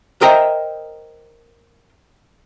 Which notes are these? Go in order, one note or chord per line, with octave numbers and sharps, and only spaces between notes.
A#4 C5 D#5 E5 G5 A#5